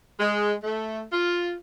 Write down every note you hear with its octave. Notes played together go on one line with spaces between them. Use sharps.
G#3
A3
F4